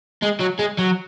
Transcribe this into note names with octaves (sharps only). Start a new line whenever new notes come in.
G#3
F#3
G#3
F#3